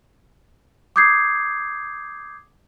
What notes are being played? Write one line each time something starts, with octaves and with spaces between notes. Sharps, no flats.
D6 D#6 G6 G#6 C7